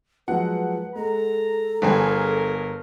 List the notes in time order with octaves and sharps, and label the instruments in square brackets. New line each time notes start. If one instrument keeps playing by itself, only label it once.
[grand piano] F3 F#3 G#3 [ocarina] B4 [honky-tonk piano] F#5
[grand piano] G#3 [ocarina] A4 [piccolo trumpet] A#5
[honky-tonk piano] G1 G#4 [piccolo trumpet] A#4 [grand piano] B4 A5 B5